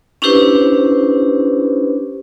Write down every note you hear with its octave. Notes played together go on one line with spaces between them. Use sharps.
C#4 D4 E4 G4 B4 C5